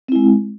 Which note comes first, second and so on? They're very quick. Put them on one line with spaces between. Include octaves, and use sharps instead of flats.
C4 E4 G#3